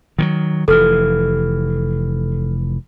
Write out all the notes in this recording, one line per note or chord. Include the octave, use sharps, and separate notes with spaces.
D#3 F3 F#3
F1 E3 A4 F6